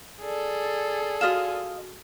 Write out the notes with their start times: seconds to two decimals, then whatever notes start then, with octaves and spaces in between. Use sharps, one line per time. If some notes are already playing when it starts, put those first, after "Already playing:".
0.21 G#4 A4 D5
1.21 F4 F#4 D#5 F6 E7